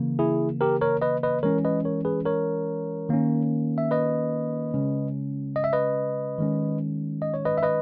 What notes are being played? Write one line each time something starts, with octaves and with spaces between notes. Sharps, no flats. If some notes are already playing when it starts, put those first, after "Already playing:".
Already playing: C#3 E3 A#3
E4 G#4
G4 A#4
A#4 C#5
B4 D#5
B4 D#5
E3 G#3 C#4 A#4 C#5
B4 D#5
A#4 C#5
G#4 B4
A#4 C#5
D#3 A#3 C#4
E5
B4 D#5
C#3 G#3 C#4
D#5
E5
B4 D#5
D#3 G#3 C#4
D#5
C#5
B4 D#5
E5
B4 D#5